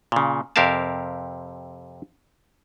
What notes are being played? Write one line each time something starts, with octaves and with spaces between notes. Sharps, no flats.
A#2 C#3
F2 C3 G4 A#4 F5 A5